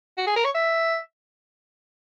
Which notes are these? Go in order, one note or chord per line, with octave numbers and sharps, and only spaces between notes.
F#4
G#4
A#4
C#5
E5